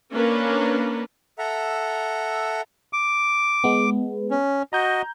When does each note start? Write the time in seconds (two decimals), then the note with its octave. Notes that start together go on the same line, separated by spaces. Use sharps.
0.13 A#3 C#4 D4 A#4 B4
1.39 A4 E5 F#5 A#5
2.93 D6
3.64 G#3 B3
4.31 C#4
4.73 F#4 D#5 A#5 G6